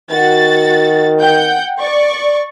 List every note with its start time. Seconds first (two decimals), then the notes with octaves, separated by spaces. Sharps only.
0.11 D#3 F#4 A6
1.20 F#5 G5 G6
1.78 D5 C#6